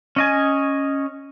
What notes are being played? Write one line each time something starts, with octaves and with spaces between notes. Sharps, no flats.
C#4 D#5 G#5